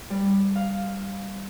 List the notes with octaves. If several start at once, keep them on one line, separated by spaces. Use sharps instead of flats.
G3
F5